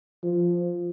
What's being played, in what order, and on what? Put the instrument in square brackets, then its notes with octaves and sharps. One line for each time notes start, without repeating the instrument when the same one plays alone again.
[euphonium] F3